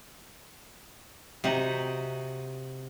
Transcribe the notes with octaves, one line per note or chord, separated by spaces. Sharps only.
C3 D#4 F#4 F#5